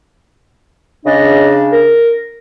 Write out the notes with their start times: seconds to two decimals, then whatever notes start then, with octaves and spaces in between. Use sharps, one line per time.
1.06 C#3 D4 D#5
1.72 A#4